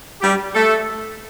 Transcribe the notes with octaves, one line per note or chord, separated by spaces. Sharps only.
G3 G4
A3 A4